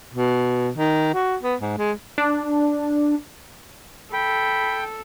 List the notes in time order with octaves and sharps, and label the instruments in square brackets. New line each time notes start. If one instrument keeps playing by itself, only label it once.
[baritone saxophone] B2
D#3
F#4
B3
G#2
G#3
[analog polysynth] D4
[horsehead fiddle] A4 [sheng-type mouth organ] G5 [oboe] B5